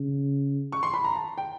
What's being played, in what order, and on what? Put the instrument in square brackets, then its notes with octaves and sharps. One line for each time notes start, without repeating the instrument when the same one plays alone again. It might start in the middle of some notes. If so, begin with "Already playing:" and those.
Already playing: [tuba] C#3
[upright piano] C#6
C6
B5
A#5
A5
G5